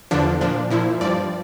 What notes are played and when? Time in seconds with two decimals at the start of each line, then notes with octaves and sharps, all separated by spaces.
0.11 E2 D3 F3 D4
0.41 A#2 F3 D4
0.70 A#2 F3 E4
1.01 G2 F3 D5